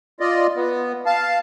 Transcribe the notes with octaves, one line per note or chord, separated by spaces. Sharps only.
F4 D5 D#5
B3
F5 A5